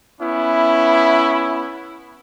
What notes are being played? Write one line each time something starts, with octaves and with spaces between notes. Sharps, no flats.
B3 C#4 E4